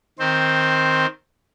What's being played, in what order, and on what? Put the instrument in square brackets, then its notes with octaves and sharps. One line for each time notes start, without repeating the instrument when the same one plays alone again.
[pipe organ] D#3 C4 C5